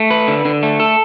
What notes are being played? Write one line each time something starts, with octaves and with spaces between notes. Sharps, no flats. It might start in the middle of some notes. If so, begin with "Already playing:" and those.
Already playing: A3
B4
D3
D3
A3
A4